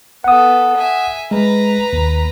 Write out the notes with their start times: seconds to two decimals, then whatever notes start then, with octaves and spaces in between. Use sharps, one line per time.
0.24 B3 A4 F#5 D#6
0.78 E5 G#5
1.31 G#3 B4 A#5
1.93 D#2